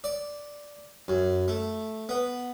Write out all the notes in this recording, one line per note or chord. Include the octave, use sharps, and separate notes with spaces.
D5
F#2
A3
B3